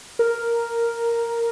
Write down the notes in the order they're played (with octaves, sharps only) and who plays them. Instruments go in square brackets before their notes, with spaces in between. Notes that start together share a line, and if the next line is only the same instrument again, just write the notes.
[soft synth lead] A#4